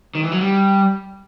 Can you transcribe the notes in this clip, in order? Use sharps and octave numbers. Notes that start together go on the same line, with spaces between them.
D#3
E3
F#3
G3